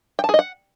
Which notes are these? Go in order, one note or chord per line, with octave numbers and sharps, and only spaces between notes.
G5
A5
G#4
D#5
F#5